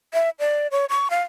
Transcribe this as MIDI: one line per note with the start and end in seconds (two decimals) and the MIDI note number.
0.14 0.30 76
0.39 0.67 74
0.72 0.85 73
0.89 1.08 85
1.10 1.22 77